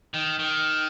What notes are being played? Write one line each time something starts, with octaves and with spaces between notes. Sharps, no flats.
D#3
D#3